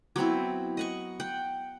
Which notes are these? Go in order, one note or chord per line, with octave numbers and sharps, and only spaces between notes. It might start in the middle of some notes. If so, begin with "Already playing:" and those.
F#3 B3 C4 E4
D#5 F#5 C#6
F#5 G5